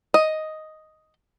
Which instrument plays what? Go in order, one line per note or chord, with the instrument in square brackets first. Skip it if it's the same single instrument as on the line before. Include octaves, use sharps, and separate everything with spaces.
[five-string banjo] D#5